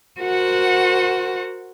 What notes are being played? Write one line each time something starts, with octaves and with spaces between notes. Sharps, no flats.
F#4 A#4 C5 F#5